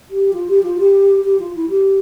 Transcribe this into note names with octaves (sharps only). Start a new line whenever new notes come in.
G4
F4
G4
F4
G4
G4
F4
E4
G4